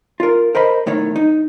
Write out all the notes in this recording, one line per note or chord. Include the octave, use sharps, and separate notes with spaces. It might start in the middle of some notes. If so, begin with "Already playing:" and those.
F4 A#4
A#4 C5 D#5 B5
B1 A2 D#3 C#5
D#4